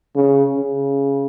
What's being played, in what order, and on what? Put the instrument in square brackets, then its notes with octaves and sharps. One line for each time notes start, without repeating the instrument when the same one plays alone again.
[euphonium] C#3
C#3